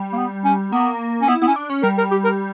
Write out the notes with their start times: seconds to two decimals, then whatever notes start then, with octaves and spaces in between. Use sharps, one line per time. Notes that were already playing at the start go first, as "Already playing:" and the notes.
Already playing: G3
0.13 A#3
0.17 B3
0.44 C#4
0.72 A#3 B3
1.22 C#4
1.28 B3 E4
1.42 B3 E4
1.47 C#4
1.56 D4
1.70 C#4
1.83 G3 A#4
1.98 A#4
2.11 G4
2.24 A#4